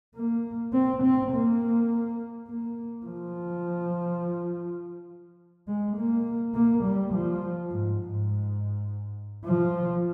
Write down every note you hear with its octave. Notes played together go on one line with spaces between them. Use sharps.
A#3
C4
C4
A#3
A#3
F3
G#3
A#3
A#3
G3
F3
G#2
G#2
F3